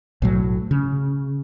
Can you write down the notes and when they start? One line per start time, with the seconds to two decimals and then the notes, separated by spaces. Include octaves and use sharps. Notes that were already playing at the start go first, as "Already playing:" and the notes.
0.22 B1 A2 F#3
0.71 C#3